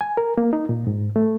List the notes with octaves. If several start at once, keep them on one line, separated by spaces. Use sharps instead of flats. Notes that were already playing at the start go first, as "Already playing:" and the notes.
G#5
A#4
A#3
D#4
A#2
G#2
A3